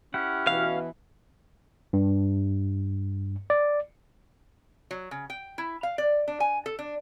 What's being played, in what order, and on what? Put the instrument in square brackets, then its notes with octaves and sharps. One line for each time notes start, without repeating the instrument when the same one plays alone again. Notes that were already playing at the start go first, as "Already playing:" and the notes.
[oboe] C#4 [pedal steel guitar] E4 G4 F#5
[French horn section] B2 E3 [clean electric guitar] F5
[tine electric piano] G2
D5
[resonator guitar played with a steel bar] F#3
C#3
G5
E4
F5
D5
D4
G#5
A4
D4